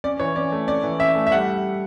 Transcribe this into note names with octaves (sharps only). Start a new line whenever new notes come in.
C#4 D5
E3 C#5
C#4 D5
A3
C#4 D5
E3
C#4 E5
A3
E5
G3 F#5